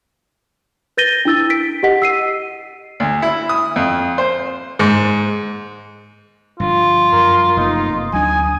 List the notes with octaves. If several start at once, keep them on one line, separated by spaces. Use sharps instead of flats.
B4 G6 A6 A#6 D#7 G7
D4 E4 E6 A6
B6 D7
G4 D#5 F#5 B6
E6 C7 D#7
D2
E4
D#6
F2
C5
G#2
G2 D3 F3 F4
F#2 A#4 C6
F1 F2 A#3 D#4
D2 F#3 D4 G#5 D#6